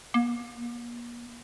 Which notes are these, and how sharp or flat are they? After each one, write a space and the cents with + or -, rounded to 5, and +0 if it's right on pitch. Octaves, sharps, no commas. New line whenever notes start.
A#3 +40